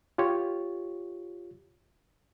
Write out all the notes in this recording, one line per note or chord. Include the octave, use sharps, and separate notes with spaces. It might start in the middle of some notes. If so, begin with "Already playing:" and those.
F4 G4 C#5